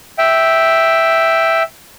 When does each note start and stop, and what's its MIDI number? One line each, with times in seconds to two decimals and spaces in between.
0.18 1.63 76
0.18 1.63 79